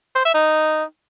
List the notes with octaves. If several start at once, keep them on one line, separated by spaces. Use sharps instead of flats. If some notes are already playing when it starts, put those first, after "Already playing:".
C5
E5
D#4